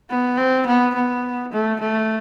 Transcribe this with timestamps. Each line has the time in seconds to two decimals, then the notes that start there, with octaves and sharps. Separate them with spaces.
0.10 B3
0.38 C4
0.67 B3
0.95 B3
1.53 A3
1.81 A3